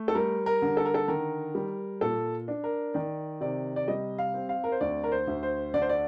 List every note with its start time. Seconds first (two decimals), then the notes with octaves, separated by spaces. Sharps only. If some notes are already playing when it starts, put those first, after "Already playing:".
Already playing: A3
0.08 A4
0.15 G3 A#4
0.46 A#4
0.62 D3
0.77 A4
0.86 A#4
0.94 A4
1.08 D#3 A#4
1.55 G3
2.01 A#2 A4
2.48 D4
2.64 A#4
2.94 D#3 D5
3.41 C3 D5
3.76 D5
3.88 G3 D#5
4.19 F5
4.34 C4
4.49 F5
4.64 A#4
4.72 C5
4.81 D2 D5
5.04 A#4
5.12 C5
5.27 D2
5.43 C5
5.74 D3 D5
5.82 C5
5.89 D5